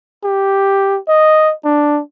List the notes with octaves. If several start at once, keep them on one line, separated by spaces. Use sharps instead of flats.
G4
D#5
D4